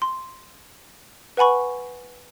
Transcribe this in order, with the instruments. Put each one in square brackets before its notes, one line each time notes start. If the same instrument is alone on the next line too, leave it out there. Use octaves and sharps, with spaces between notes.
[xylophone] C6
B4 F#5 G#5 B5 C#6